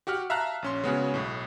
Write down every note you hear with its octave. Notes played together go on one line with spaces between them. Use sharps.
F#4 G4 F#5 F6
E5 F5 A5 A#5 E6 F#6
A#1 C#4 C6
C#3 G#3 B3 C#4 F#4 G#4
B1 A2